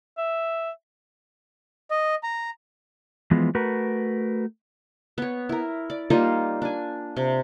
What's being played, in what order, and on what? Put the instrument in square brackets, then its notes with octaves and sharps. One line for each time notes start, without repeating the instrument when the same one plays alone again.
[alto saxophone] E5
[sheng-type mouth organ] D#5
A#5
[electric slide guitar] E3 F3 G#3 B3
A3 F#4 A#4 B4
[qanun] B3 C#5
E4 A#4
D5
G3 A#3 D#4 F4
D4 G#5
C3